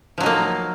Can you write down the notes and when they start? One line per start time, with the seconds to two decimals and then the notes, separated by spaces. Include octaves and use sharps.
0.18 F3
0.20 F#3
0.23 D#4
0.26 A#3